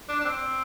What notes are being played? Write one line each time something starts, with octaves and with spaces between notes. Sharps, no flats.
D4
D4
C4